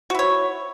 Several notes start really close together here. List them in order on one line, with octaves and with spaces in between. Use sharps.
F#4 E4 C#5